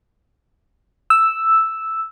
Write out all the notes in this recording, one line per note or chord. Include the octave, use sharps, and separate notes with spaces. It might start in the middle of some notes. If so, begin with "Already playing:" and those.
E6